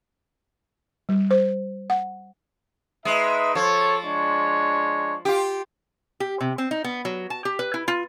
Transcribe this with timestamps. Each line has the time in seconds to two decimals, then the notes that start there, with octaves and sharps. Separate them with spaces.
1.09 G3
1.31 C5
1.90 F#5
3.05 G#3 D#4 B4 E5
3.55 F3 A4 C#5
4.03 G#3 D4 C#5
5.25 F4 G4
6.20 G4
6.41 C3
6.58 C4
6.71 D#4
6.84 B3
7.05 F#3
7.30 A5
7.45 G4
7.59 B4
7.74 E4
7.88 F4